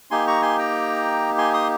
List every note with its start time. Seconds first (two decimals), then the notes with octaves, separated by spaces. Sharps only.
0.11 A#3 D#4 G4 G#5 C6
0.27 A#5 C#6
0.42 G#5 C6
0.58 G5 A#5
1.38 G#5 C6
1.54 C6 D#6